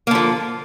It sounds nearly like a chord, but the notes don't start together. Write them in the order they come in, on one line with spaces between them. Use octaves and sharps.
A#3 D3 F3